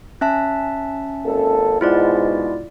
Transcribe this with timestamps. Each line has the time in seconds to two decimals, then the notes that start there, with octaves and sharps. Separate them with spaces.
0.21 C#4 E5 A5
1.25 G#1 A#3 A4
1.81 G#2 B2 E4 F4 D5